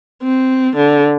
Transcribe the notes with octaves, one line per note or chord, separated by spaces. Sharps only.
C4
D3